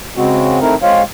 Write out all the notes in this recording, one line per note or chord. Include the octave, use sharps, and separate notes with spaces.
C#3 G#3 C4 F#4
A3 C4 D#4 E4 A#4
G#3 C4 F4 C#5 F5